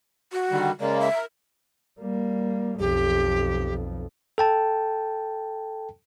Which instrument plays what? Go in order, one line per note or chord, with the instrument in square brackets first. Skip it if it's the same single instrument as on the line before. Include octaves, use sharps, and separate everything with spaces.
[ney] F#4
[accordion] D3 D#3 G3
[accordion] C#3 G#3 A#3 [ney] D5
[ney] E5
[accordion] A#4
[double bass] G3 A#3
[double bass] B1 F2 [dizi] G4
[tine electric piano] A4 G5 A5